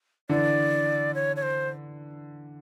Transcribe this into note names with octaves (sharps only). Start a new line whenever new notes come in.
D3 E3 D5
C#5
C#5
C5